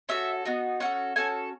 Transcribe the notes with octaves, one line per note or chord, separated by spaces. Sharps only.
C#4 F#4 A4 E5
B3 D#4 F#4
C#4 F#4 A4 F#5
C#4 F#4 A4 G#5